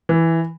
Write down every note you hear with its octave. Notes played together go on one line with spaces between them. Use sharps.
E3